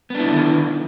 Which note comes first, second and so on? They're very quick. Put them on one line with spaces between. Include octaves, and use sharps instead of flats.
B3 D4 E4 D3 D#3